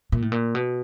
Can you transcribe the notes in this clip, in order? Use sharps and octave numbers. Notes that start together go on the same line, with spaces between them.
A#2
A2
A#2
B2